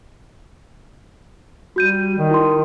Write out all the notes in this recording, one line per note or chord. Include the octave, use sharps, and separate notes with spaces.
G3 F#4 G6 D#7
D#3
E4 C6